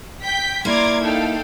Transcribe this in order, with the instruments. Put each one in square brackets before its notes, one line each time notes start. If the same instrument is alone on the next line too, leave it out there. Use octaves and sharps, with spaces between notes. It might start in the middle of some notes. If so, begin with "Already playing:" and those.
[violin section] G5 G6 B6
[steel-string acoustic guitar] A#3 E4 [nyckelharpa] D5 D6 [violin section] A#5 C6 G#6
[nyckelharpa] D#4 G5 [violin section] A4 F5